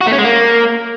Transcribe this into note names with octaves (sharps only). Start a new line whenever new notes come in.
F#4
A3
C#4
G#3
A#3